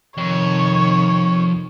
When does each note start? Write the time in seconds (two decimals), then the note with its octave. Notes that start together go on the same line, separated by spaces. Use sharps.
0.18 F2 C3 D#3 C#5